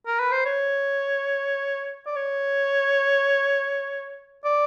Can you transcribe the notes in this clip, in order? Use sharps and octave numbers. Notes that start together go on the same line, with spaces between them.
A#4
B4
C5
C#5
D5
C#5
D5